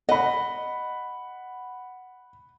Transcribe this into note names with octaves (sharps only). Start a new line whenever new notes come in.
D#5 F#5 B5